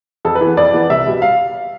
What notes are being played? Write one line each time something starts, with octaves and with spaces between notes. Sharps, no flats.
F2 A4
B4
E3 B3
F2 D5
E3 B3
C2 E5
B2 G3
F5